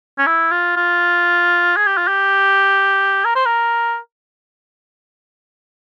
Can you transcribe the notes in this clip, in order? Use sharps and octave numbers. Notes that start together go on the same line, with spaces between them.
C#4
E4
F4
F4
G#4
G4
F4
G4
A#4
C5
A#4